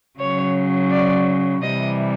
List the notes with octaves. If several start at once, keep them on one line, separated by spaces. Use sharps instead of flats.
C#3 F#3 C#5
D5
C3 E3 G3 D#5